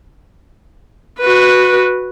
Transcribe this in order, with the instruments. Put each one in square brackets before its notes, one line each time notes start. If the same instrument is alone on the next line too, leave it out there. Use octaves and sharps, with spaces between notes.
[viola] F#4 B4